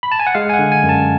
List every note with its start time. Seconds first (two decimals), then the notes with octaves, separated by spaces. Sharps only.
0.03 B5
0.12 A5
0.19 G#5
0.27 F#5
0.35 G#3 F5
0.49 G#5
0.54 F#5
0.59 D3
0.72 G#5
0.83 F#2
0.89 A5